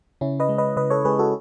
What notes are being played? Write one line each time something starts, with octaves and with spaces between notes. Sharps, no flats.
C#3 C#4 E4
B4 D#5
G#3
B4 D#5
C#3 B4 D#5
A4 C#5
G#3 G#4 B4
F#4 A4